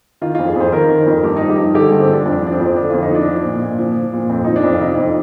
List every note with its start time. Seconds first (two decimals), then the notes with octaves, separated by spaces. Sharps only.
0.22 D#3 F4
0.35 F2 F4
0.47 G#4
0.55 F2 C5
0.72 D#3 A#4
0.89 D#3
1.06 F2
1.23 G2 G4
1.37 F3 D#4
1.49 G4
1.58 G2 D#4
1.74 D3 G4
1.87 G2 G#4
2.00 C4
2.09 F3 D4
2.25 F2 D4
2.43 F3 D4
2.52 C4
2.60 F2
2.76 D3 D4
2.90 F2 F4
3.03 D#4
3.11 F3 D4
3.28 F3
3.44 A#2
3.62 A#2
3.79 F3
3.96 F3
4.13 A#2
4.29 F2 C4
4.44 F3 D#4
4.56 D4
4.64 F2
4.73 F4
4.80 C3 D#4
4.98 F2